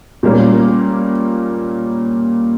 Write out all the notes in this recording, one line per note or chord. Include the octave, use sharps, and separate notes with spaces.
A#2 G3 A#3 C#4